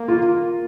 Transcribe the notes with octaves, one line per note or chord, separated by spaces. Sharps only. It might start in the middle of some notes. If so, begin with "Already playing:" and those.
Already playing: A#3
F4